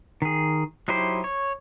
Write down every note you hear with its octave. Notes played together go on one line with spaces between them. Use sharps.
D#3 G#4
F#3 D#4 E4 G4 C5
C#5